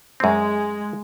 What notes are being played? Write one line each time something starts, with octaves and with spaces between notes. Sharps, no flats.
F#2 G#3 C4